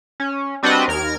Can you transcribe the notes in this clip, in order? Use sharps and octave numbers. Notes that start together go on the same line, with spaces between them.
C#4
G3 C4 D4 F#4 B4 D#5
D#2 A#4 F6 G#6